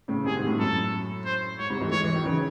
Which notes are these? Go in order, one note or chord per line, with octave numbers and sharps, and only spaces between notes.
A2 C#3
C3 D#3 G#4
G#2 C3
F#2 A2
F#2 A2 A4
C5
G#2 C#5
G#2 C3
E3 G#3
A3
E3 G#3 C#5
E3 G#3
D#3 F#3
C#3 E3